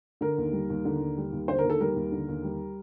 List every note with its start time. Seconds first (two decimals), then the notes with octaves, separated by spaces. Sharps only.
0.21 D3 A#4
0.38 D#2
0.53 G3
0.70 D#2
0.85 D3
1.01 D#2
1.17 G3
1.33 D#2
1.48 D3 C5
1.59 A#4
1.64 D#2
1.70 A4
1.80 G3 A#4
1.96 D#2
2.12 D3
2.28 D#2
2.44 G3